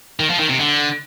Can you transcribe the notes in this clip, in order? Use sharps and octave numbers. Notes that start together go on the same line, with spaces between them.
D#3
F3
D#3
C3
D3